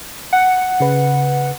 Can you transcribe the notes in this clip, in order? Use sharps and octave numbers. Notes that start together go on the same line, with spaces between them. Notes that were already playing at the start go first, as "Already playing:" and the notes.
F#5
C#3 B4